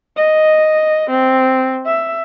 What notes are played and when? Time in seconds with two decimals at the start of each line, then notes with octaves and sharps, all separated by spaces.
0.17 D#5
1.10 C4
1.86 E5